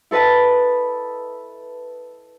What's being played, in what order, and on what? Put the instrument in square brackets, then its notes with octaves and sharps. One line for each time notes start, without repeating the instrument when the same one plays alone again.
[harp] E4 A4 B4 D#5 A5